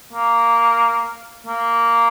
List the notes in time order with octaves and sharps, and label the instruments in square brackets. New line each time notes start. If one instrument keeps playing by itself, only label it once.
[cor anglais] A#3
A#3